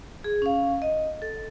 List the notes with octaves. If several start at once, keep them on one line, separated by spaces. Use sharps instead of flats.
G#4
C#4 F5
D#5
A4